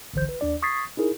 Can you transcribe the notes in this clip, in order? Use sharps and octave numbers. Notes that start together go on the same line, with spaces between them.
G1 C2 D3 E3 C5 G6
B4
D#2 D4 D5
C#6 D#6 G#6 A6 B6 C7
D#4 E4 G#4 A#4